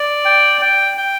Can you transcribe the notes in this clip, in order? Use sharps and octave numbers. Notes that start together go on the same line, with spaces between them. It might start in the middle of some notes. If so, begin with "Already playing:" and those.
Already playing: D5
G5
G5
G5